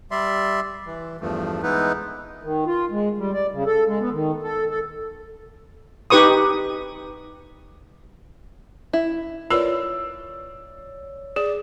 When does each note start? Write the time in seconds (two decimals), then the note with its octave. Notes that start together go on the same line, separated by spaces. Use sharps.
0.11 G3 D5 E5 C6
0.86 E3
1.21 E2 G2 F3 A3
1.63 E3 G#3 B3 D#4 E4 B4
2.43 D#3
2.66 F4
2.91 G#3
3.18 G3
3.33 D5
3.52 C#3
3.66 A4
3.87 G#3
4.00 B3
4.12 D#3
4.42 A4
4.69 A4
6.10 D#4 G4 B4 C#6 D#6
8.93 E4
9.50 F4 A#4 B4 C#5 D5 E6
11.36 G#4 D5